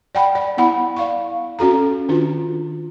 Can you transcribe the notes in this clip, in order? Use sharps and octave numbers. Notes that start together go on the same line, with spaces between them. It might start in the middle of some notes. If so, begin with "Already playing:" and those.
D5 F#5 G5 A5 B5
D5
B3 E4 F#5 B5
D5 F5 C#6
C#4 F#4 A4 A#5
D#3 D4 F4